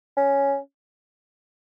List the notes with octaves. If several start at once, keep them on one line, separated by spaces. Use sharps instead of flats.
C#4